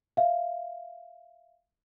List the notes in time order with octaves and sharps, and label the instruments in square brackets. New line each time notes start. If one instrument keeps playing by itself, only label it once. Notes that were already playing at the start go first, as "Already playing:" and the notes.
[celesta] E5 F5